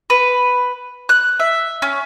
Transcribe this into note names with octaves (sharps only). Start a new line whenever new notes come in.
B4
F#6
E5
C#4